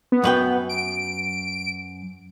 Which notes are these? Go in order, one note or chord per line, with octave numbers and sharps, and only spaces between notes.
B3
F#2 B4 G5
D7